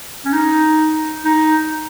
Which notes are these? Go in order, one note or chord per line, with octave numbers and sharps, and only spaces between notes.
C#4
D#4
D#4